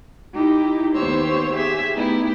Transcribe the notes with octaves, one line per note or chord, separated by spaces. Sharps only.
D#4 E4 G4
D#2 B3 G4 C5 C#5 E6
G4 G#4 E5
A3 B3 D#4 E4 G4